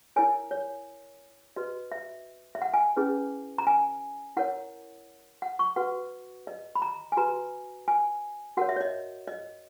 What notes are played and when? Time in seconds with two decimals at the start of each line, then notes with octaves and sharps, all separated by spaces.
0.16 E4 A#4 C#5 G#5
0.51 C#5
1.56 F#4 B4 D#5
1.92 E5
2.55 E5
2.62 F#5
2.74 G#5
2.96 C#4 E4 G#4 B4
3.58 A#5
3.67 G#5
4.37 E4 A#4 C#5 F#5
5.42 F#5
5.59 C#6
5.76 F#4 B4 F#5
6.47 D#5
6.75 B5
6.82 A#5
7.12 G#5
7.17 F#4 B4 A#5
7.88 G#5
8.57 F#4 A#4 C#5 F#5
8.69 E5
8.76 C#5
8.81 D#5
9.28 D#5